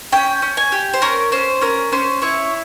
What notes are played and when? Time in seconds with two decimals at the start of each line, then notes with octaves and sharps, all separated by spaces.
0.12 C#4 G5
0.42 C#4
0.57 G#5
0.72 G4
0.93 C5
1.02 C#4 A#4
1.32 C#4 C5
1.61 C#4 A#4
1.92 C#4 C5
2.22 E4 C#5